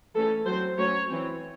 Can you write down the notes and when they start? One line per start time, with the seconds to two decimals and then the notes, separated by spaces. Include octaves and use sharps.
0.15 E3 A3 C#4 A4
0.46 F#3 C4 C5
0.77 F#3 A3 C#4 C#5
1.08 E3 C4